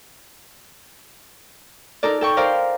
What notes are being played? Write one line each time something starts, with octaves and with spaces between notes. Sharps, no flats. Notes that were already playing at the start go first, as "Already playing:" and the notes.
D#4 A4 A#4 D5
A4 G5 C#6
A#4 C5 D5 F5